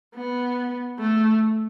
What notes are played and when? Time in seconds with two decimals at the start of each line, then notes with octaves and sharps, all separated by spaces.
0.15 B3
0.99 A3